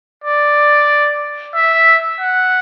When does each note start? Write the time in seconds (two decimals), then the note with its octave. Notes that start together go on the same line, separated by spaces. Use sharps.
0.24 D5
1.55 E5
2.20 F#5